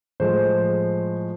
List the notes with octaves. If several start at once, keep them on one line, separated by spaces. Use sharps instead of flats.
A2 F3 G#3 C5